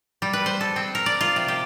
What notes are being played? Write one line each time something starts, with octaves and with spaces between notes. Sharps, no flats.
G3
B4
C5
A4
C4
A#4
D5
F4
C3
G4